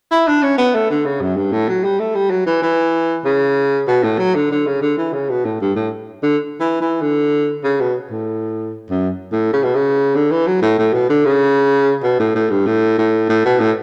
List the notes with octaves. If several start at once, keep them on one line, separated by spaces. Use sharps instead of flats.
E4
D4
C#4
B3
A3
D3
C#3
F#2
G2
A2
F#3
G3
A3
G3
F#3
E3
E3
C#3
B2
A2
F#3
D3
D3
C#3
D3
E3
C#3
B2
A2
G2
A2
D3
E3
E3
D3
C#3
B2
A2
F#2
A2
C#3
B2
C#3
D3
E3
F#3
A2
A2
B2
D3
C#3
B2
A2
A2
G2
A2
A2
A2
B2
A2